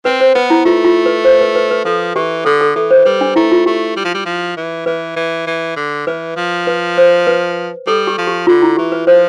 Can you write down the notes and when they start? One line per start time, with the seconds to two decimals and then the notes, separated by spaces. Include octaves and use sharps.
0.05 C4 B4
0.20 C5
0.35 B3 B4
0.50 E4
0.65 A3 F4
0.85 F4
1.06 B4
1.25 C5
1.41 B4
1.55 B4
1.71 B4
1.85 F3 A4
2.16 E3 G4
2.45 D3 A4
2.61 A4
2.75 E3 A4
2.91 C5
3.05 G3 B4
3.21 D4
3.36 A3 E4
3.51 F4
3.66 A3 G4
3.96 G3
4.05 F3
4.14 G3
4.26 F3
4.57 E3
4.86 E3 B4
5.16 E3
5.47 E3
5.76 D3
6.07 E3 B4
6.36 F3
6.67 B4
6.98 C5
7.27 B4
7.87 G3 A4
8.07 G4
8.18 F3
8.27 G4
8.47 D3 F4
8.62 E4
8.77 E3 G4
8.92 B4
9.07 F3 C5